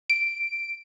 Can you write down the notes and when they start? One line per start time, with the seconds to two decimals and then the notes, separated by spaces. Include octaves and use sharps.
0.10 D7